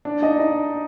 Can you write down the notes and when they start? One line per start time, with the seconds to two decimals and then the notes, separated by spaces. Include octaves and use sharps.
0.05 D4 D5
0.22 D#4 D#5
0.38 D#4 D#5